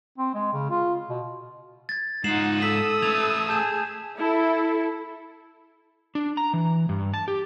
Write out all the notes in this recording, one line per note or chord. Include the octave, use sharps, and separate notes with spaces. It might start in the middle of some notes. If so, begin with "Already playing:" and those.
C4
G#3
C#3
F4
B2
G#6 A6
G#2 D#4 F4 F#5 C7 E7 F#7
A4 D#6 E6 B6 F#7
A3 B4 G#6 A6 F7
G#4 A5 G6 E7
E4 A4
D4
A#5
E3
G2
A5
G4